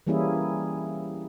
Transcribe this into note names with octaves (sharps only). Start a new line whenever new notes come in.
E3 G3 A#3 C#4 E4 G#4